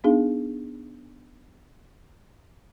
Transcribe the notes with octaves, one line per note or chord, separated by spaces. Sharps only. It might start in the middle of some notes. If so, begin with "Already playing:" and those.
B3 D4 D#4 G#4 F5